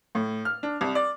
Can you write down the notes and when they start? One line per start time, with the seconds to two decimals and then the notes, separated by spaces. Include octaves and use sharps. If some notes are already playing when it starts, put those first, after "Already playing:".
0.15 A2
0.45 F6
0.63 D4
0.81 C2
0.95 D5